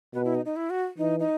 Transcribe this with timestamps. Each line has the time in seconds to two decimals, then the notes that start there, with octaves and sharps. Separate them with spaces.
0.14 B2 B4
0.25 E4
0.35 D#4
0.45 D#4
0.56 E4
0.70 F#4
0.98 E3 D#4
1.20 D#4